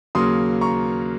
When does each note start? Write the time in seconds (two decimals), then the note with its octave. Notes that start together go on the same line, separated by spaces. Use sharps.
0.15 D#2 C#3 F#3 A#3 C6 D#6
0.61 A#5 C#6